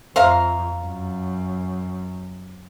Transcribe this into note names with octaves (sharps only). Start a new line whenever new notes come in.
F2 C5 E5 F5 A#5
F#2